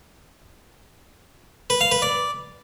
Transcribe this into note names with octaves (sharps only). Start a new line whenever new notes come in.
B4
F5
B4
D5